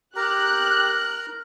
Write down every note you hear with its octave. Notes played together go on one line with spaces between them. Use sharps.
G4 A#4 A#5 F#6